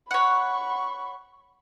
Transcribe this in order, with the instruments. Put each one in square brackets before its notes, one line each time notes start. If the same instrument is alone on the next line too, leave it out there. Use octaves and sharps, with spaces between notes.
[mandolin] C#5 F#5 [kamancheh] B5 C#6